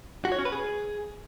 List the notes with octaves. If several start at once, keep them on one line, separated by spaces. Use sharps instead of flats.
F#4
C#5
C#4
B4
G#4